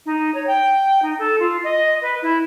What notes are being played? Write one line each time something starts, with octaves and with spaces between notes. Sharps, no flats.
D#4
C#5
G5
D#4
A4
F4
D#5
B4
E4